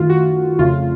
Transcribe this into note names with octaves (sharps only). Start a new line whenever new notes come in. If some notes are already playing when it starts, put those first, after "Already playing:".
Already playing: F#2 D#3 A3 F4
F#4
F2 C#3 A3 F4